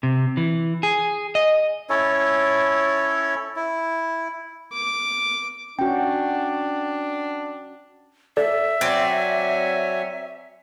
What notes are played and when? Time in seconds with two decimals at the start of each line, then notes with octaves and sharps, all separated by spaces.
0.03 C3
0.37 E3
0.83 G#4
1.35 D#5
1.89 C#4 E4 A4 C#5
3.56 E4
4.73 D6
5.79 C#4 D4 F#4 G5
8.37 A4 D5 E5
8.81 F#3 C4 C#5 D5 G#5 A6